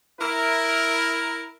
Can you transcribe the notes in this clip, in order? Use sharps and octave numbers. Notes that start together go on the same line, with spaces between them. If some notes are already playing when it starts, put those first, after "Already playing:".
E4 A#4